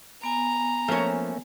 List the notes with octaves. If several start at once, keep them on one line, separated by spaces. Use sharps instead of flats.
B3 G#5 A#5
F3 A3 A#3 C#4 C#5